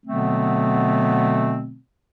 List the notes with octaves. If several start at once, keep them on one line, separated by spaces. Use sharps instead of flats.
B2 D3 F#3 A3 B3 C4